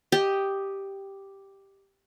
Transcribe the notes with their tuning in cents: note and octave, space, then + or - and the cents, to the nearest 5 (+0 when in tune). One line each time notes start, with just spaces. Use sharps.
G4 +0 D#5 +0